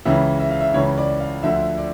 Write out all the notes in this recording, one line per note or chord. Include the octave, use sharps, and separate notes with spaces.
C#2 C#3 E3 E5
E5
F5
E5
C#2 C#3 E3 C#5
D5
F5
D2 D3 F3 E5
D5